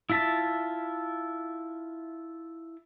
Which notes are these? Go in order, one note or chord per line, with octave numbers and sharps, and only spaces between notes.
E4 F4 E5 A5